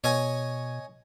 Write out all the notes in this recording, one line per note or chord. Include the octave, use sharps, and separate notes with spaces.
B2 C#5 D#5 G#5